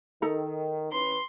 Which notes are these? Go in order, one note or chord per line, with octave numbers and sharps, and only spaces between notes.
D#3 D#4 A4 A#5
E3 C#4 B4 C6